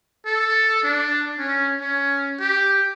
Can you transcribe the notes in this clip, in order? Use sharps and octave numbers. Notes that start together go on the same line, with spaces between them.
A4
D4
C#4
C#4
G4